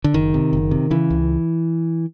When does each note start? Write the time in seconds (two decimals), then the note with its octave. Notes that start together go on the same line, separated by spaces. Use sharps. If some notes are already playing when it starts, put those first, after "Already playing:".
0.04 D3
0.14 F#1 D#3
0.34 C3
0.53 F#1
0.71 C3
0.91 C#3 E3
1.10 C#2